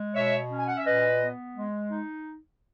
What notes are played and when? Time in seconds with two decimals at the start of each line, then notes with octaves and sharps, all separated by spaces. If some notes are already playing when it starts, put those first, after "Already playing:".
Already playing: G#3
0.14 B2 C#5 E5
0.50 C#4
0.57 G#5
0.67 F#5
0.76 E5
0.85 A#2 B4 D#5
1.20 B3
1.55 G#3
1.91 D#4